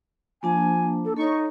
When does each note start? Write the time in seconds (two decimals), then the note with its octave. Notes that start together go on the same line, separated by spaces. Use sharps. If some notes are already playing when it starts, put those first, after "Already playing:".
0.43 F3 A#3 D4 G#5 A5
1.05 A4
1.17 D#4 A4 C#5 C#6